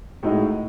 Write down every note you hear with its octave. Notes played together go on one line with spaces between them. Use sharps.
A2 G#3 D#4 F#4